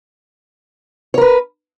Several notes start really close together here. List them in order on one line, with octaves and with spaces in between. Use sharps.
C#5 A#4 B4